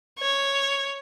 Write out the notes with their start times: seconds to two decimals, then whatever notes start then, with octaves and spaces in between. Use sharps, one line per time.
0.19 C#5